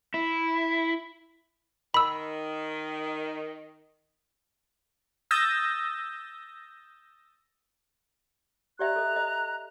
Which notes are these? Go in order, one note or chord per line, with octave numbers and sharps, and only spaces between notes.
E4
D#3 B5 E6
D#6 E6 G6 A6 A#6
G4 D5 E5 A#5 F#6
A4 D#5
D#5